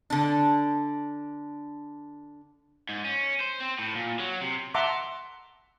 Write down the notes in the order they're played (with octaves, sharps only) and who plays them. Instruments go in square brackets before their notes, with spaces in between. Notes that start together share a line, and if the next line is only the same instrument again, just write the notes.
[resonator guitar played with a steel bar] D3 D4
[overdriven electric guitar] G#2
C#4
C5
C4
A2
A#2
F#3
C3
[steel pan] E5 F#5 A5 A#5 C6 D6